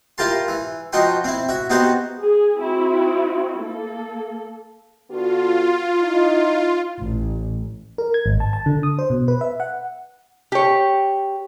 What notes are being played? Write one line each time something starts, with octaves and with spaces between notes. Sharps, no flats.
E4 F4 G4 A#4 A5 C6
E3
F3 D#4 F#4 G5 C6
C4 E4
F#4 E5
B3 C4 D#4 F#4 G4 C5
G#4
C4 E4 F#4
A#3 A4
D3 B3 F4 F#4
D#4 E4
A1
A#4
G#6
G#1
A5
A5
D3
D#6
C5
B2
B4
E5
F#5
G4 C#5